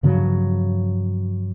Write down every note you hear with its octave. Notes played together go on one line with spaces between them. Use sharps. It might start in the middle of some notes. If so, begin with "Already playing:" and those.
G2 C#3 F3 F#3